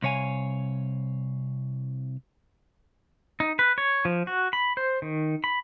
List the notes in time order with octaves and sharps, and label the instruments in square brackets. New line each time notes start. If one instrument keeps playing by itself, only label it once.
[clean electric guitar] C2 C3 C#5 F5 G#5
[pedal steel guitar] D#4
B4
C#5
F3
F#4
B5
C5
D#3
B5